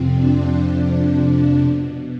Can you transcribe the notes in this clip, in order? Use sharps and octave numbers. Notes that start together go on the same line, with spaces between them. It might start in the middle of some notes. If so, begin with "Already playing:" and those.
Already playing: F2 C3 F3 C4
D4
F2 C3 F3
B2